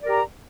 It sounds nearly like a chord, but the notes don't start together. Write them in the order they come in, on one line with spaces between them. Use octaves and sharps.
D5 A#4 G4 A#5